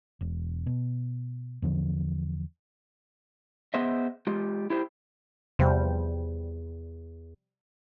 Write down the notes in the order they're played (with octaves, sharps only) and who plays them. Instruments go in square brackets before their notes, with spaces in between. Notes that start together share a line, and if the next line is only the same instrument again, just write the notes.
[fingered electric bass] E1
B2
E2 D3 F3
[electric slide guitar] B3 G#4 C5 D#5 E5
G#3 F4 G4
E4 G4 C5
[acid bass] E2 [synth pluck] C3 F3 G3